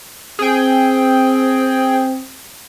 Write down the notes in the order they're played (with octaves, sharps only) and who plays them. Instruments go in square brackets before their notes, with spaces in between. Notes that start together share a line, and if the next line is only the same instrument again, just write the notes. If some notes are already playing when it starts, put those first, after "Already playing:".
[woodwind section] C4 [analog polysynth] G#4 G5